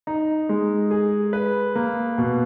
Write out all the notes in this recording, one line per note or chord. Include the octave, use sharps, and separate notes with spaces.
D#4
G#3
G#4
B4
A#3
B2